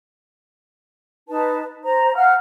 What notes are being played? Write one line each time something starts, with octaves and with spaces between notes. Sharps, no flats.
D#4 B4 A5
C5 A#5
F5 F#5 F6